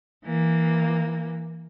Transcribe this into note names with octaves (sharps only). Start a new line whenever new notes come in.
E3 A#3